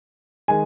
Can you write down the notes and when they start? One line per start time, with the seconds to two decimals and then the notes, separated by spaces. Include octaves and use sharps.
0.48 D#3 G#3 G#5